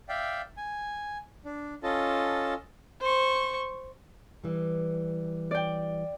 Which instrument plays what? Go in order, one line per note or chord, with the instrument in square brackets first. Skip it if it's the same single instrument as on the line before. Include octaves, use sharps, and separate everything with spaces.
[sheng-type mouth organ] D5 E5 F5 G5
G#5
D4
C#4 F4 A4 D#5 A5
[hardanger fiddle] C5 C#6
[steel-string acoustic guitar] E3 G3
[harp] D5 G5